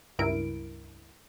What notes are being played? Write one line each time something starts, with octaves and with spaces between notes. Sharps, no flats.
C#2 G2 E4 A#4 D7